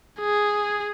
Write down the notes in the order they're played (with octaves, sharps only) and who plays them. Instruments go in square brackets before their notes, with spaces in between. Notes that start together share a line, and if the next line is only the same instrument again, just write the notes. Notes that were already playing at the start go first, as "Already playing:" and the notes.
[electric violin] G#4